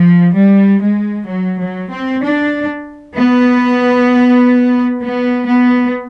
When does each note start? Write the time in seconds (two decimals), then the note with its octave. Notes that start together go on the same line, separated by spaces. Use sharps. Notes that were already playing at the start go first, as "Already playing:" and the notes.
Already playing: F3
0.37 G3
0.83 G#3
1.29 F#3
1.61 F#3
1.92 C4
2.23 D4
3.16 B3
5.02 B3
5.48 B3